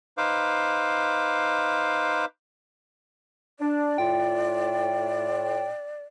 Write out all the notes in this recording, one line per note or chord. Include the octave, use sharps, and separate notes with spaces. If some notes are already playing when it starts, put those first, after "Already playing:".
D#4 B4 C5 F5 D6
D4 D5
A2 F4 G5